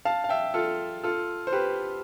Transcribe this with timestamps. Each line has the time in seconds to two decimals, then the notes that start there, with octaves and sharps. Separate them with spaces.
0.05 F5 A5
0.24 F5
0.29 E5 G5
0.54 F4 A4
1.03 F4 A4
1.47 C5
1.52 G4 B4